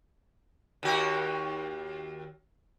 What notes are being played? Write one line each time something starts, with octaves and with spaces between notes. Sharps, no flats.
D#2 F#4 G4